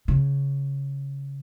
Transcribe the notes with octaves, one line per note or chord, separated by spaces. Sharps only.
C#3